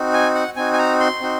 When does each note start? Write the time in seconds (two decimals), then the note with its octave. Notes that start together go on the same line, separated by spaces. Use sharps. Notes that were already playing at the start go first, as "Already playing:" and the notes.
Already playing: C4 D#4 F#4
0.13 G#5
0.35 F#5
0.56 C4 D#4 F#4 G#5
0.73 G#5
0.78 A#5
1.00 C6
1.21 C4 D#4 F#4